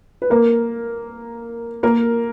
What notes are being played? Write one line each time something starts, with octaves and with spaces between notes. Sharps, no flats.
B4
A#3 A#4
A#3 A#4